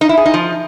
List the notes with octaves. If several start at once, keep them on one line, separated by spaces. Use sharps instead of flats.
D#4
E4
G#4
D#4
F3